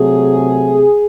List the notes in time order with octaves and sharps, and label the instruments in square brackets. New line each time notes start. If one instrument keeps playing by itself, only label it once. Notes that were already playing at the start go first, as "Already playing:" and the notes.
Already playing: [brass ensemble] C3 F#3 A3 G#4